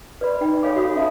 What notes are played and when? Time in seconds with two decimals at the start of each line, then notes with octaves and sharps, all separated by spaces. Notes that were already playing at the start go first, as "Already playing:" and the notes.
0.21 B4 D5 B5
0.41 D#4 G5 B5
0.63 A4 C#5 F5 G#5 B5 D6
0.76 F#4 F5 D#6
0.96 C#4 E5 F5 A5 B5